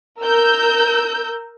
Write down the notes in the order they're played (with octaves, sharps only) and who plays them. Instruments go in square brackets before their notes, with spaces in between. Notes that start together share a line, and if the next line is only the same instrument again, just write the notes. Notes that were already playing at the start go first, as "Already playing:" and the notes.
[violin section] A#4 E6 G6